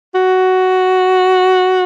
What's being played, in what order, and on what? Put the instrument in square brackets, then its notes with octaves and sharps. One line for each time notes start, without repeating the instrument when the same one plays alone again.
[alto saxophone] F#4